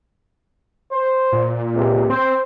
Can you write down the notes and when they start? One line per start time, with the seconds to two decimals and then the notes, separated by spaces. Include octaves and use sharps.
0.91 C5
1.32 A#2
1.75 C#2 C3
2.10 C4 C5